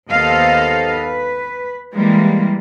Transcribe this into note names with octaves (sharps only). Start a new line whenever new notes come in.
D#2 B3 A4 C5 D#5 F5
B4
E3 G3 G#3 A#3